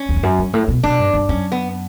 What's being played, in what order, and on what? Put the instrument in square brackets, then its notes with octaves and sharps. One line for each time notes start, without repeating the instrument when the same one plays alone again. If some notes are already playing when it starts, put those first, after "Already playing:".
Already playing: [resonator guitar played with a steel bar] C#4
[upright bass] E2
G2
F#2
G2
A2
B2
[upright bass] B2 [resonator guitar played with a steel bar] D4
[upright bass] G2
G2
[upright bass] F#2 [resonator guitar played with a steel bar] C#4
[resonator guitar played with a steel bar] B3